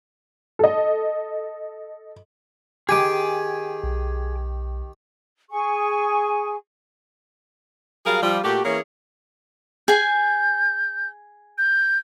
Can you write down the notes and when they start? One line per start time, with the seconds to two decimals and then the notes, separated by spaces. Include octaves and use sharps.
0.59 A4 D#5
2.89 D#3 G4 G#4 G#5 D6
3.84 B1
5.50 G#4 G#5 C#6
8.06 F#3 G3 G#4 A#4 F5
8.23 F3 G3 F4
8.44 A#2 A3 F#4 G4
8.65 E3 A#3 C#4 G#4 A#4 C#5
9.88 G#4 G#5 G6
11.58 G6